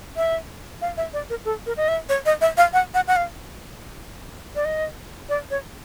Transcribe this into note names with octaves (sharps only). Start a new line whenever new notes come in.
E5
F5
E5
D5
A#4
A4
A#4
D#5
E5
C#5
D#5
E5
F5
F#5
F#5
F#5
F5
D5
D#5
D5
C#5